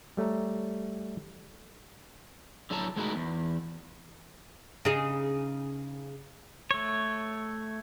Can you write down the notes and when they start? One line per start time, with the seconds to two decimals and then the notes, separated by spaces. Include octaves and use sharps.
0.17 G3 A3 C#5 A#5
2.70 D3 F#3 E4 A4 A5 A#5
2.96 G#3 A3 D#4 E4 F#4 A#4
3.15 E2
4.85 C#3 D#4 G#4
6.71 A3 C#5